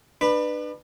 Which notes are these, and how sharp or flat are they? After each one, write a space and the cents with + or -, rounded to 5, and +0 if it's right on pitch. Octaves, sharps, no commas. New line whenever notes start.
D4 +35 B4 +0 B5 +0